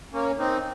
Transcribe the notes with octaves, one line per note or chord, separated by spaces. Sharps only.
A#3 C#4
C4 D#4